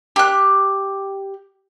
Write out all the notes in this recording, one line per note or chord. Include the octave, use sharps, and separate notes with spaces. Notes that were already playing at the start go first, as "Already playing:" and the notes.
G4 F#6